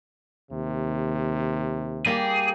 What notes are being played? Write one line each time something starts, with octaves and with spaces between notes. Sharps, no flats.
D#2 C3
G3 A#3 G4 G#4